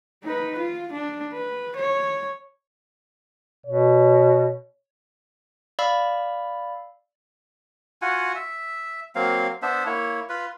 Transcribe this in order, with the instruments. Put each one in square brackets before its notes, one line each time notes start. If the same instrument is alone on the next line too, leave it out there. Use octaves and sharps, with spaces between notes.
[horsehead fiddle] D#4 B4
F4
D4
B4
C#5
[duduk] B2 [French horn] C#5
[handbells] D5 F5 B5 E6
[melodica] F4 F#4 F#5 G#5
E5
F#3 A#3 C4 F5
B3 D4 C5 E5
A#3 E4 C#5
F4 B4